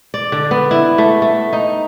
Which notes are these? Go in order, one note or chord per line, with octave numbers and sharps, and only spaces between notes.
D5
D3
B3
E4
A3
A3
D#4